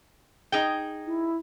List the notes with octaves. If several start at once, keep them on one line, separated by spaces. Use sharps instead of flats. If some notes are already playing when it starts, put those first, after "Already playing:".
D#4 G#4 G5
E4